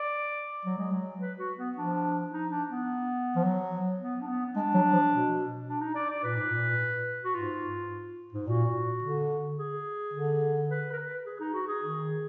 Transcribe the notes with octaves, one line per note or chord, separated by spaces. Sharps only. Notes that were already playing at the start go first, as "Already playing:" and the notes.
Already playing: D5
F#3
G#3
F#3
B4
F#4
B3
F3 D4
D#4
D4
B3
F3
F#3
B3
D4
B3
B3
G#3 D4
F#3
F3
B2
D4
D#4
D5
D5
A#2 B4
G#2
A#2
F#4
G#2 F4
G#2
A#2 F#4
D3
G#4
D3
B4
A#4
B4
G#4
D#4
F#4
G#4
D#3